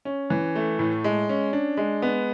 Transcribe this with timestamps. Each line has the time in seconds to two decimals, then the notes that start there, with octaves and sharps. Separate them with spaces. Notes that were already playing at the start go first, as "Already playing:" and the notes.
0.05 C#4
0.30 E3
0.55 A3
0.79 A2
1.04 G#3
1.29 C#4
1.53 D4
1.77 G#3
2.02 B3